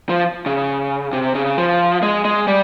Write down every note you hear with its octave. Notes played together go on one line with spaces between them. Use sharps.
F3
C#3
C3
C#3
F3
G#3
G#3
G3